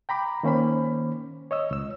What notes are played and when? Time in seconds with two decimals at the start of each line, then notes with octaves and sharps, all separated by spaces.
0.09 G5 A#5 B5 D6
0.43 D#3 A#3 C#4 C5 B5
1.51 C#5 D#5 E6
1.71 C#2 E6